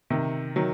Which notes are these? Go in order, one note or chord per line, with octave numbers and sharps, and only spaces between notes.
C3 D#3
D#3 F#3